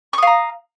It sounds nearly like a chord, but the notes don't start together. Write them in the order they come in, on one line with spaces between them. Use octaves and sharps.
C#6 D#6 F5 A#5